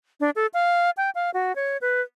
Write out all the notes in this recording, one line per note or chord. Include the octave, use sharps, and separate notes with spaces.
D4
A4
F5
G5
F5
F#4
C#5
B4